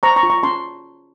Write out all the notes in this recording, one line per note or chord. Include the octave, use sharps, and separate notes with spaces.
C5 A#5 C#6
A#5 C#6
F4
A#5 C#6
C#4 A5 C6